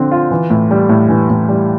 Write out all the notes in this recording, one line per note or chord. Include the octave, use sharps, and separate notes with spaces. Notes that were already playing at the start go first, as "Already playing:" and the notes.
Already playing: D3 F3 C4
F4
E3
A2
G3
A2
E3
A2
G3